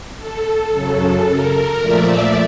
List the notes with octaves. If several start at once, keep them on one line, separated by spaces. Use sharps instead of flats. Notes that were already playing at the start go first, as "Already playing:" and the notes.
A4
F#2 C#3 F#3
A#4
A#2 F3 A3 D5 E5